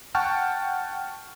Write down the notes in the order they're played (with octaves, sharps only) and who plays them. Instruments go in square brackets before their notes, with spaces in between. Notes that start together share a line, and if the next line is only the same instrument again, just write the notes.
[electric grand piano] F#5 G5 A5 C#6 F6